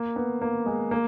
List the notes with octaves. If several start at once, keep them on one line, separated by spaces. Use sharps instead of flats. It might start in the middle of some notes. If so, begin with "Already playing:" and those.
Already playing: A#3
B3
A#3
G#3
A#3